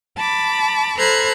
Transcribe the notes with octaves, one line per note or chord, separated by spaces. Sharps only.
A5 B5 D6
A4 C5 A#5 B5 F#6 G#6